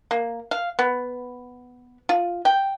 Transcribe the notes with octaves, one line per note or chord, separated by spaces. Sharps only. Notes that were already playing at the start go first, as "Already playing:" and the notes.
A#3
F5
B3
F4
G5